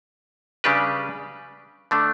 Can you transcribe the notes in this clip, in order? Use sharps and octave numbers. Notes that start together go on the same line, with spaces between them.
C#3 G3 D4 G4 B4
D3 A3 D4